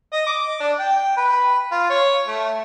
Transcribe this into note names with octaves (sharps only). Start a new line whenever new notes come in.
D#5
D6
D4
G5
B4
F4
C#5
A3